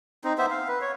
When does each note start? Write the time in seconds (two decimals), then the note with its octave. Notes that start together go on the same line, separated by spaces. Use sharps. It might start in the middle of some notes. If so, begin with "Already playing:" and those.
0.24 C4 D#4
0.38 B3 C5 E5
0.50 F5
0.68 B4
0.81 C#5